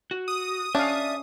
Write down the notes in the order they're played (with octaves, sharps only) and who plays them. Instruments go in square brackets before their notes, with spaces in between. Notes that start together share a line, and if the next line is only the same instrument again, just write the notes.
[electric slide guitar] F#4
[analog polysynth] D#6
[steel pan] C#4 F5 [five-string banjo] D4 [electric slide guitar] E5